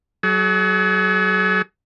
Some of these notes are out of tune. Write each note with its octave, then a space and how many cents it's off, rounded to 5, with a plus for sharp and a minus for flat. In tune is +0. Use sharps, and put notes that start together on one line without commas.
F#3 +25 G#4 +45